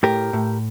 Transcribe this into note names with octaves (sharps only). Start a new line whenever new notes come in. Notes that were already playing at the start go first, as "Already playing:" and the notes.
A2 G4 A#4
A2